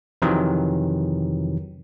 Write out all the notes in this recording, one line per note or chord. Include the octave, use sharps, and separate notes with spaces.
F2 C3 D#3 E3 F#3